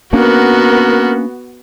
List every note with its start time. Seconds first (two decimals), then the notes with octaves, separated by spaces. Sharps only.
0.13 A#3 B3 C#4 D4 F#4 A#4